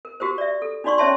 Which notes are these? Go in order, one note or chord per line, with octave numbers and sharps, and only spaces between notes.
A#4
F#4 G4 A#4 C5
D5 E5
A4
D4 D#4 F#4 D5 C6 C#6
C#4 C#5 E5 A5 C6